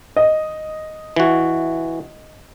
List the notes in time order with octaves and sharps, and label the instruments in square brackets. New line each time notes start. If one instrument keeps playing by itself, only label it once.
[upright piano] D#5
[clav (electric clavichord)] E3 F#4